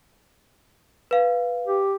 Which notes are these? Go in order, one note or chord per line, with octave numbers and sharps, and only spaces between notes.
B4 F5
G4